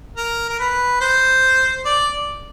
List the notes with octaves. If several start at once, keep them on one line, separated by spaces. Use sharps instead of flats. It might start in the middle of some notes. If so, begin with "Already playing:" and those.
A#4
A#4
B4
C5
D5